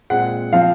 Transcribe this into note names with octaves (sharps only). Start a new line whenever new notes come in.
A#2 G#3 C4 F#5
F3 C4 F5